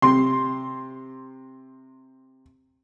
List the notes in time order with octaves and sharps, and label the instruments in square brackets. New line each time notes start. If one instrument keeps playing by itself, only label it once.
[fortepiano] C3 C6